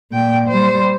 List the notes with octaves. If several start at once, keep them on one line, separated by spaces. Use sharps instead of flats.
A#2 G5
G3 C5